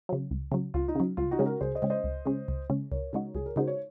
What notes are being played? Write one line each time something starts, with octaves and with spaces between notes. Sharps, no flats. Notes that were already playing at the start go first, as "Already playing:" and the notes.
C#3 F#3
C#2
C#3 F#3
C#2 F4
D#4
C#3 F#3
C#2 F4
D#4 F#4
C#3 G#3 C#4
F#4 A#4
C#2 G#4 C5
C5 D#5
C#3 G#3 C#4
C5 D#5
C#2
C#3 G#3 C#4
C#2
C#3 G#3 C#4
C#2 A#4 C#5
C#3 G#3 D#4 F#4
C#2 G#4
A#4
C#3 G#3 D#4 F#4 C5
C#5